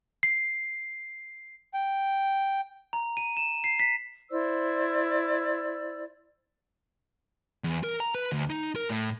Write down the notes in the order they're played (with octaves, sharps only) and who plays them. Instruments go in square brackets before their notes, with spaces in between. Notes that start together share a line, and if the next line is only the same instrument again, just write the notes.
[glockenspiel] C7
[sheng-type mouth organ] G5
[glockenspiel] A#5
D#7
E7
C7
B6
[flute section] E4 C5 D5 E6
[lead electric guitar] E2
A#4
A#5
B4
D2
D#4
A#4
A2